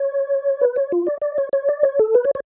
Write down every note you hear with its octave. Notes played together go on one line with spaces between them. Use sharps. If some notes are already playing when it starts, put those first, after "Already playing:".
Already playing: C#5
B4
C#5
F4
D5
D5
C#5
C#5
D5
C#5
A4
B4
C#5
C#5